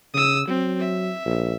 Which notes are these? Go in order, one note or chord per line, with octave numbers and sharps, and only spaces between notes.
C#3 D#6 E6
F#3 C4
E5
A#1